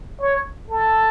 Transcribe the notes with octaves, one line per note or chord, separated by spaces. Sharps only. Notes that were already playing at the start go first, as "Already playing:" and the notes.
C#5
A4